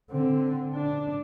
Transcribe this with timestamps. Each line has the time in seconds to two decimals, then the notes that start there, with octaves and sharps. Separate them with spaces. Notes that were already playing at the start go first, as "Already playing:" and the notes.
0.10 D3 C4
0.74 D4